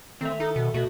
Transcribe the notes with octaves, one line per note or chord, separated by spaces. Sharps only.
D#3 A3 C4 E5
D#4 A4
B2
B2 A3 F#4